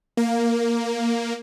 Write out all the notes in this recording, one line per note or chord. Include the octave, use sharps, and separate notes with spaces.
A#3